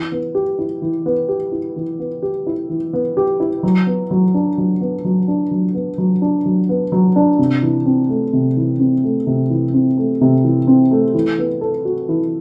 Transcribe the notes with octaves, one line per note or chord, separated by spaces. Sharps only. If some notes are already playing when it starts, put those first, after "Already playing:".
Already playing: E3
B3
G4
E4
E3
B3
G4
E4
E3
B3
G4
E4
E3
B3
G4
E4
F#3
B3
F#3
D4
F#3
B3
F#3
D4
F#3
B3
F#3
D4
F#3
B3
F#3
D4
C3
E3
C4
A3
C3
E3
C4
A3
C3
E3
C4
A3
C3
E3
C4
A3
E3
B3
A4
F#4
E3